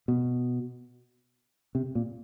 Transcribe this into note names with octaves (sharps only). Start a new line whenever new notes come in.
B2
C3
A#2